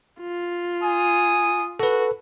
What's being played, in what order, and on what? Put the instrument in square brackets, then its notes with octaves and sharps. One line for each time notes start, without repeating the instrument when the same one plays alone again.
[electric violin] F4
[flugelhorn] G#5 [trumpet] D#6
[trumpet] F#4 [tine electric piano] A4 B4